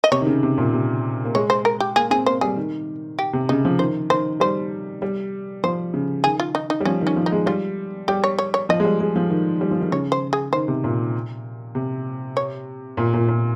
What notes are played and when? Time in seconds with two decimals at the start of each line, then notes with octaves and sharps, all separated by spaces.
0.04 D#5
0.12 C3 C#5
0.21 D#3
0.27 C#3
0.43 C3
0.58 A#2
0.73 C3
1.25 A#3
1.35 G#3 C#5
1.50 C5
1.65 A#4
1.80 G4
1.96 A#3 G#4
2.10 C4 G#4
2.26 A#3 C5
2.41 G3 G#4
2.56 D#3
3.19 G4
3.33 C3
3.49 C#3 D#4
3.65 F3
3.79 D#3 C5
4.10 D#3 C5
4.40 G3 C5
5.02 G3
5.64 F3 C5
5.94 C#3
6.24 D#3 G#4
6.40 F4
6.55 D#4
6.70 D#4
6.80 G3
6.85 F3 C#4
7.01 D#3
7.07 C#4
7.16 F3
7.26 D#4
7.32 G#3
7.46 G3 F4
8.08 G3 G4
8.24 C#5
8.39 C#5
8.54 C#5
8.69 F3 D#5
8.80 G#3
8.85 G3
9.00 G#3
9.16 F3
9.30 D#3
9.61 G3
9.71 F3
9.81 D#3
9.91 C#3 C#5
10.12 C5
10.33 G#4
10.53 D#3 C5
10.68 C3
10.84 A#2
11.75 C3
12.37 C#5
12.97 A#2
13.14 A#2
13.28 A#2